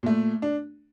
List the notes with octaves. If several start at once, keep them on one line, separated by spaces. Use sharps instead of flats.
A#2 A3
D4